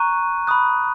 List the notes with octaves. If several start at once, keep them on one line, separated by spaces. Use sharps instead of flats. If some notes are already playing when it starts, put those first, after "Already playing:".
Already playing: A#5 C#6 F#6 D#7
B5 D#6 F#6